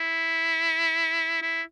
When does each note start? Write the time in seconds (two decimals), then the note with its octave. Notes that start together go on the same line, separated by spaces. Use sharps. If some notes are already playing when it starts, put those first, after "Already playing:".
Already playing: E4
1.42 E4